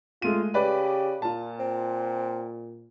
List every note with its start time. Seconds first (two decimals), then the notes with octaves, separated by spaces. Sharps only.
0.22 G#3 A3 F4 D#7
0.54 C#3 G4 B4 D5
1.22 A#2 F4 A5
1.60 C4